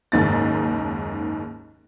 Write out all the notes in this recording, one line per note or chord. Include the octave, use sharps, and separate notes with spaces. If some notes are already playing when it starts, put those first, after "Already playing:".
F#1 D#2 G#2 A6